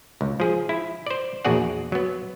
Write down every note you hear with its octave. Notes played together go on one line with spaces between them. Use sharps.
C#2
F3 G#4
E4
C5 D5
A#1 E2 F#4 G#4 D5 F#5
F#3 B3